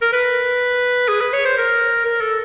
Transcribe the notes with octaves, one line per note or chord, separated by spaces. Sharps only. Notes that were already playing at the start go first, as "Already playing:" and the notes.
A#4
B4
G#4
B4
C#5
C5
A#4
A#4
A4